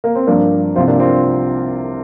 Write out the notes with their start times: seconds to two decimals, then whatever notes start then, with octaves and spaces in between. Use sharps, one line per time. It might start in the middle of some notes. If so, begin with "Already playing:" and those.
0.04 A#3
0.15 C4
0.27 G2 F3 A#3 D4
0.75 C2 C3 F3 C4 F4
0.87 A#3 D4
1.00 C4 F4